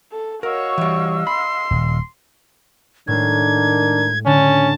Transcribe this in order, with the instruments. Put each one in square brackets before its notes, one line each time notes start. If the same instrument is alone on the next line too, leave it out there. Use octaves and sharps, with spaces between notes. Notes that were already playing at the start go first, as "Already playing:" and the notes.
[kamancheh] A4
[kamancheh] F#4 C#5 [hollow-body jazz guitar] A#4 [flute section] D#5 F5 E6
[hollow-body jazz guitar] E3 G3
[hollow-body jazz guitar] B5 [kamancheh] C6
[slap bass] D#1
[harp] A2 G#3 [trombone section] D#3 D4 A#4 [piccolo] G#6
[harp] D3 [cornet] C#4 [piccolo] A5